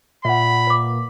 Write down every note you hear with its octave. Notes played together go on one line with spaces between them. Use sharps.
A#2 E5 F#5 B5
B4 D6